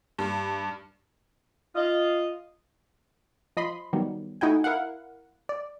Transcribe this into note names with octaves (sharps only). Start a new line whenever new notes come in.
G2
F4 D#5
F3 D#5 B5 C6
D#3 F#3 G3 B3
A3 D#4 E4 F#4 G5 G#5
E4 A#4 F5 F#5
D5